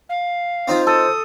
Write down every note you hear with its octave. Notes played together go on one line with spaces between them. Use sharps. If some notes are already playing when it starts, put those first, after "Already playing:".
F5
C4 D#4 F4 C5
A4 D#6